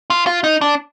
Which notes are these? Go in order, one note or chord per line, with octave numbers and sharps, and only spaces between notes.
F4
F4
D#4
D4